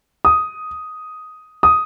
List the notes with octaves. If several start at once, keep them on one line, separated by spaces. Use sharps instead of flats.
D#6
D#6